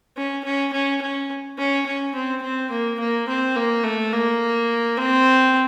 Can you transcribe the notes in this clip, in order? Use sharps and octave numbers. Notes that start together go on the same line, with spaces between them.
C#4
C#4
C#4
C#4
C#4
C#4
C4
C4
A#3
A#3
C4
A#3
A3
A#3
C4